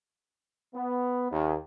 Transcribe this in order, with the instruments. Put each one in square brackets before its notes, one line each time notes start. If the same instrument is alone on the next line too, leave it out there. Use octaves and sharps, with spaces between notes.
[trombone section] B3
D#2